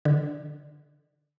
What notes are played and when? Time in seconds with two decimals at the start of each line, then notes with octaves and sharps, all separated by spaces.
0.05 D3